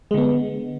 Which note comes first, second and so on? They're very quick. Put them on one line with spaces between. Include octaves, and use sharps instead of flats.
G#3 D3 B3